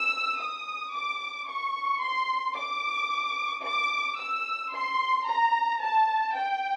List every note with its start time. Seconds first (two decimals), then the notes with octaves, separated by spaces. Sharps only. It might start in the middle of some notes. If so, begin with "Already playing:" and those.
Already playing: E6
0.40 D#6
0.94 D6
1.49 C#6
2.02 C6
2.57 D6
3.65 D6
4.19 E6
4.74 C6
5.28 A#5
5.82 A5
6.36 G5